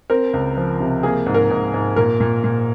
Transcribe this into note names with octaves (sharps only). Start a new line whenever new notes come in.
C4 A#4
C#2
F3
C3
A#3 G#4
G#2
A#4
G#2
G#2
A#2 A#4
A#2
A#2